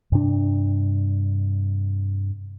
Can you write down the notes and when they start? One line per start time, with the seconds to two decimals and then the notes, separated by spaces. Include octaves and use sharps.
0.12 G2 C3 D4